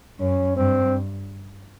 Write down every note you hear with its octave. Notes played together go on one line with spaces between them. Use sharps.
F#2 C#4
G2 C4